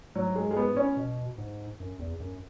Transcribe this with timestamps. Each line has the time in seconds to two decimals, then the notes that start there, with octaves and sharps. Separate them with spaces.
0.16 G#2 F#3
0.35 G#3
0.51 G#3
0.57 B3
0.77 C#4
0.97 B2
1.38 G#2
1.80 F#2
1.99 E2
2.20 F#2